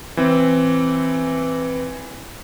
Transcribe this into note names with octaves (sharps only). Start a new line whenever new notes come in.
E3 C4